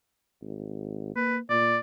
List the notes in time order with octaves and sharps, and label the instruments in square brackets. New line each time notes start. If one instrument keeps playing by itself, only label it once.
[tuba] G#1
[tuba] A#3 [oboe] B4
[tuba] A#2 [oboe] D5